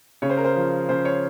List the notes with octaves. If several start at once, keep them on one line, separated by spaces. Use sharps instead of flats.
C#3 C#5
C5
A#4
C5
F3
C#3 C5
C#5